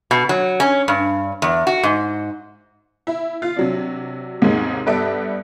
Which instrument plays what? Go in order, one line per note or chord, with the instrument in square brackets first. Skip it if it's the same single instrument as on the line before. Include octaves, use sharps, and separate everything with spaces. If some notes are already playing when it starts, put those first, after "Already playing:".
[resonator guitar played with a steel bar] B2
F#3
C#4
G2
E2
F#4
G#2
[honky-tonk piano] E4
F4
C3 F#3 D4
D#2 G#2 C3 G#3 A#3
G2 B3 A4 D5 E5 D7